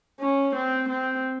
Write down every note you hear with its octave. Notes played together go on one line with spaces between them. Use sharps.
C#4
C4
C4